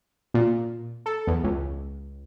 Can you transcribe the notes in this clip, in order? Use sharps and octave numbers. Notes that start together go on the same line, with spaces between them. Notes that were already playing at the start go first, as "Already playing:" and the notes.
A#2
A4
E2
C#2